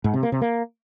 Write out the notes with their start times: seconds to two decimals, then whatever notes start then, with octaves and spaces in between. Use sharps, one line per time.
0.04 G#2
0.14 C3
0.23 A#3
0.32 C3
0.41 A#3